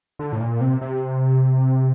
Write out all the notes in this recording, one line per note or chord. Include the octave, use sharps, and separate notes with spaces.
D3
A2
A#2
C3
C3